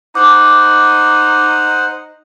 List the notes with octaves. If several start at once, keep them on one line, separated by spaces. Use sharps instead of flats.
D#4 C5 F#5 D6